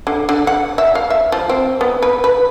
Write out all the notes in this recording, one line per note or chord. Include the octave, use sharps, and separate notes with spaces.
D3
D3
F#5
E5
F5
E5
F3
C4
B3
B4
B4